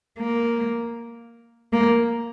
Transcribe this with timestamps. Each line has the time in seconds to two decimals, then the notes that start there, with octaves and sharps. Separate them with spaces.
0.19 A#3
1.73 A#3